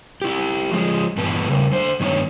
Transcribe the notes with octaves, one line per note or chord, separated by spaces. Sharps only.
E4 G4
F3 G#3
G2 A#2 E3 B3 B4 A5
C#3 G3
D3 C5
G2 D#3 B3 D4 C#5